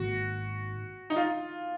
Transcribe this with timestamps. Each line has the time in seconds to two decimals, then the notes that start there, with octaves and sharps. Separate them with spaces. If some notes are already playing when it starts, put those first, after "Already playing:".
Already playing: G#1 G#2 D#3 A#3 F#4
1.10 D#4
1.16 F4